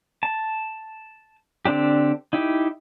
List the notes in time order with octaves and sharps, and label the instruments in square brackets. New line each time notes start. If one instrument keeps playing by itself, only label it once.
[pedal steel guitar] A5
D3 C4 D4 G4
D#4 E4 G4